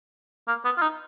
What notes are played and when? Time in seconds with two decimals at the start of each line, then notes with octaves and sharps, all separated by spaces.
0.48 A#3
0.65 B3
0.77 F4
0.82 D#4